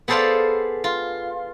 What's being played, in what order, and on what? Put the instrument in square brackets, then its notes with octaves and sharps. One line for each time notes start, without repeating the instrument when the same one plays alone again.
[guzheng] B3 G#4 A4 C5 D5 F5
F4